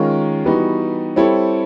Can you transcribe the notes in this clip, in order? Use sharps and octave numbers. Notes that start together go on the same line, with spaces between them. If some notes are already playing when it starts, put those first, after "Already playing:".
Already playing: D#3 G#3 C#4 F4 A#4
E3 G3 B3 D#4 F#4
G3 C4 E4 A4 C#5